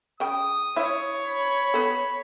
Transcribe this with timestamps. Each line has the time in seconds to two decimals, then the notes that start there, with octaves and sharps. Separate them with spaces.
0.20 C#3 G5 D#6
0.76 E4 C#5 E5
1.26 B5
1.74 B3 A4